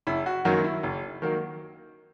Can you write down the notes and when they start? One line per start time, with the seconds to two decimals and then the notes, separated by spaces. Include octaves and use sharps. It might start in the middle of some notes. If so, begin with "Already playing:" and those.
0.07 F#1 E4
0.26 F#4
0.45 F#2 D#3 F#3 A#3 F#4
0.64 E4
0.83 F#1
1.22 D#3 F#3 A#3